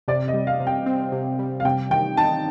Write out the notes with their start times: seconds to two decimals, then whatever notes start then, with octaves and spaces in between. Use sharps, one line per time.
0.08 C3 D5
0.28 D#5
0.34 G3
0.47 F5
0.60 C3
0.67 G5
0.86 C4
1.12 C3
1.39 G3
1.60 F5
1.65 C3 G5
1.91 D#3 G5
2.17 D#4 A5